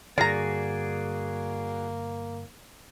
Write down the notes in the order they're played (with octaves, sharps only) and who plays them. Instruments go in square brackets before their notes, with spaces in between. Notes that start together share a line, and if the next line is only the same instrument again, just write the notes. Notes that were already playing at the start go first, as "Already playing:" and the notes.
[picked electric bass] G2 D3 [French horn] A#3 [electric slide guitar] F#4 G#4 D5 [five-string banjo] A#4 A#5